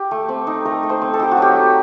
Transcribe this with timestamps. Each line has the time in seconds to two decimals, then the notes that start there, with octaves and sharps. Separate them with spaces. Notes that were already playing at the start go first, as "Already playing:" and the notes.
Already playing: G4
0.11 A3
0.29 C4
0.47 D#4
0.65 A3 A#4
0.83 A3
0.90 C5
1.02 C4
1.13 A4
1.19 D#4 G4
1.31 F#4
1.37 F#3 G4
1.56 F#3